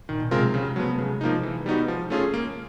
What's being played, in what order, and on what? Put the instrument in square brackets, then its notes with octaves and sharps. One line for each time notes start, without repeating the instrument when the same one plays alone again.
[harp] A#2 [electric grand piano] D#3
[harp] B2
[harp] C3 [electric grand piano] G#3 C4 F4 A#4
[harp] F#3
[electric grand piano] C#3 [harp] G3
[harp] G#3
[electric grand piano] F#3 B3 [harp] A3
[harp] A3
[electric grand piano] C#3 [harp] G#3
[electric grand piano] F3 A#3 D#4
E3
G3 B3 D#4 F#4
F3
A3 C#4 F4 G#4
A#3